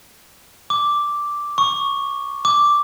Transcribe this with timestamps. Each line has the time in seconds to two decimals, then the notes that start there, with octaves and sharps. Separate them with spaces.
0.70 D6
1.58 C#6
2.45 D6